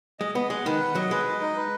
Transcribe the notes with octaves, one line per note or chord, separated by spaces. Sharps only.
G#3 D#5
B3 D#5
G#3 F#5
D#3 B4
F#5
F#3 D#5
G#3 B4
D#5
D#4
B4